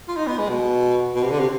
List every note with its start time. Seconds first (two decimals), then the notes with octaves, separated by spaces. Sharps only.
0.08 F4
0.17 D#4
0.27 B3
0.39 G#3
0.49 B2
1.15 B2
1.23 C3
1.31 D3
1.39 C3